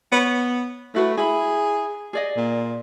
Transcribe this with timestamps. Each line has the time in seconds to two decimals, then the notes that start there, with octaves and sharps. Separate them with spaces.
0.12 B3 C#5
0.95 A3 E4 F#4 B4
1.17 E4 G#4 B5
2.13 G#4 D5 D#5
2.36 A#2